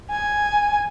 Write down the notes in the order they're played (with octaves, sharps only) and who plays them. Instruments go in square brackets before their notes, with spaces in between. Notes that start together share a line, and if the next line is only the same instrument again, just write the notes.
[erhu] G#5